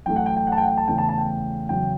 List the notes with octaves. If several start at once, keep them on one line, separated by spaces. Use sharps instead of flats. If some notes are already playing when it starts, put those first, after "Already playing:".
F#2 E3 A3 G5
F#5
G5
G5
F#5
A5
G5
F#5
G5
A5
E2 C#3 E3 A3 G5
A5
A5
G5
E2 C#3 F#3 G5